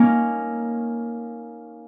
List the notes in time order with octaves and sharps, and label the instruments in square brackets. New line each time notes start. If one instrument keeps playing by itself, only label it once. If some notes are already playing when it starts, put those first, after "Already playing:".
Already playing: [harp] A#3 C#4 D#4